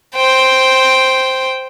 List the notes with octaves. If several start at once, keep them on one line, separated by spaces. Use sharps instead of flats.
C5 G5